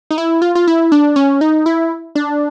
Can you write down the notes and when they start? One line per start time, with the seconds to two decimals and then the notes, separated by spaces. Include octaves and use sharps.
0.11 D#4
0.18 E4
0.42 F4
0.55 F4
0.67 E4
0.92 D4
1.16 C#4
1.41 D#4
1.66 E4
2.15 D4